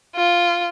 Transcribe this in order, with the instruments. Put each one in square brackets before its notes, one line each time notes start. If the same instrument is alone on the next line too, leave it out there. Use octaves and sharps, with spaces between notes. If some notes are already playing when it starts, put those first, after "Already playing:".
[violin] F4